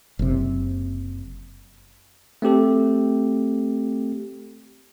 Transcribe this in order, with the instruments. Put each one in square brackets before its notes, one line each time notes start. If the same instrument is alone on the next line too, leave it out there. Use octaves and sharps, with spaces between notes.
[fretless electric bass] F#1 C3
[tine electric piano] A3 C4 G4 A4